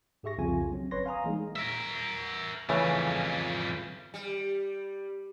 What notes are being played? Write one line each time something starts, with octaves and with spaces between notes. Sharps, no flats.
G#2 G4 G#4 E5 C#6 A#6
C2 F2 C#3 F4 G#5
F#3 C4 C#4
G1 B4 C#5 C6 A#6
F5 G#5 A#5 D#6
E3 G3 G#3 A#3 D#4
A#4 E5
F2 C#3 E3 G3 A3
G3